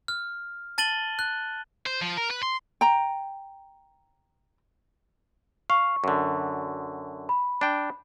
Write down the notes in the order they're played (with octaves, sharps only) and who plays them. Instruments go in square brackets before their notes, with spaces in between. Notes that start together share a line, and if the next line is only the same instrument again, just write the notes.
[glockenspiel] F6
A5 A6 D#7 F#7 G7
F#6
[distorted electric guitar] C5
F3
A#4
B4
C6
[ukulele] G5 A#5
[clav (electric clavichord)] F5 [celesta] C#6
[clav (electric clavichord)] F#2 D3
[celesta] B5
[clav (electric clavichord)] D4 G5